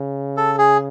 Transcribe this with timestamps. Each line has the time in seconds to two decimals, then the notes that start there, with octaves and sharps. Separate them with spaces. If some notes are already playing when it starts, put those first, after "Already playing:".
Already playing: C#3
0.37 A4
0.58 G#4